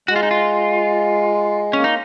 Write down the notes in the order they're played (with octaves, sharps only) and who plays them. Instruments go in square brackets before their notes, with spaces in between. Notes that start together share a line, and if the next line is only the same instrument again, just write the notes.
[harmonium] G#3 [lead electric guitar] F#4
[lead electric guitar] F4
D#4
F4
[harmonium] A#3 [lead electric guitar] C#4
[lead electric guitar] D#4